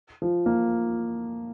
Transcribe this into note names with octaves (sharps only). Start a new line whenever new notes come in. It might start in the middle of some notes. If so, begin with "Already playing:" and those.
F3
A#3